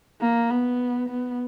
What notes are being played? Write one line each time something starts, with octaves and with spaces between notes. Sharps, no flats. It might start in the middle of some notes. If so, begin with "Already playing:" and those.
A#3
B3
B3